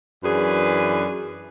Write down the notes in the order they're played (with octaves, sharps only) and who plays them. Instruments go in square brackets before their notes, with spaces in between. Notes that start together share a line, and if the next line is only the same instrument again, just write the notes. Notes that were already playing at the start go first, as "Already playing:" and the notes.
[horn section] F#2 E3 D4 G#4 B4